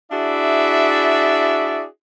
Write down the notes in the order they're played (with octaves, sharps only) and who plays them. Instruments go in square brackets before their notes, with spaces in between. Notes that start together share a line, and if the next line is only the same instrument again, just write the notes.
[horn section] D4 E4 F#4 G#4 D5 E5